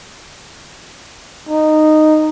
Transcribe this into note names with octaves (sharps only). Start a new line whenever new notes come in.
D#4